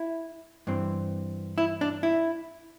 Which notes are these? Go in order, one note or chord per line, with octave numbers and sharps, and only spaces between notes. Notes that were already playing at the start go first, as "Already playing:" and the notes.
Already playing: E4
G2 E3 C4
E4
D4
E4